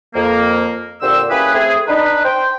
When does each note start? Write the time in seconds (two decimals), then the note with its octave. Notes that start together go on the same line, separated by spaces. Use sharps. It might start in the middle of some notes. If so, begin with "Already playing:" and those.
0.15 F2 A#3
1.01 A#2 D3 C4 G4 C5 E6
1.30 A#3 C#4 E4 G4 G#4 B4
1.54 A3 C4 G#4
1.87 D4 D#4 B4
2.25 C5 G5